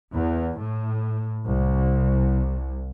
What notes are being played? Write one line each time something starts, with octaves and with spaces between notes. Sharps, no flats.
E2
A2
C2